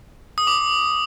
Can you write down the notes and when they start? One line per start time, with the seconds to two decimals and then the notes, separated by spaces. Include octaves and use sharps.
0.38 D#6
0.47 D6